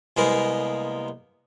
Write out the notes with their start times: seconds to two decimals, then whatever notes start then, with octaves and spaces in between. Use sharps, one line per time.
0.17 C2 G#3 A#3 B3 A#4